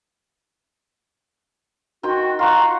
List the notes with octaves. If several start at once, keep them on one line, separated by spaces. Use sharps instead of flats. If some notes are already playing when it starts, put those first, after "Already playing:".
D#3 F#4 G5 C6
F4 F#5 A#5 C6 C#6